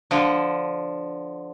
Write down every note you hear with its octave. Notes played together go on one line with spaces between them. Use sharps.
D3 F3